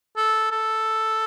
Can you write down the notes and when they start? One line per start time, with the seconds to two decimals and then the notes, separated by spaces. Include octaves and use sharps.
0.17 A4
0.51 A4